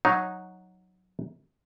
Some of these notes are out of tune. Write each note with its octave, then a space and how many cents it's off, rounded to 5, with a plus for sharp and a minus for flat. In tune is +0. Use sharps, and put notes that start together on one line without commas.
F#3 -5 D#4 +0